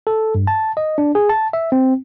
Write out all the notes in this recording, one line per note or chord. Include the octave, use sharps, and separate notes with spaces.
A4
G2
A5
D#5
D4
G#4
A5
E5
C4